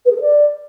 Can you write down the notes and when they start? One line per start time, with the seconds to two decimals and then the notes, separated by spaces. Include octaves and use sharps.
0.05 B4
0.10 G#4
0.15 A4
0.21 D5